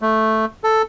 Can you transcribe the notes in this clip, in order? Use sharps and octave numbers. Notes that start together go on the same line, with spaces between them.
A3
A4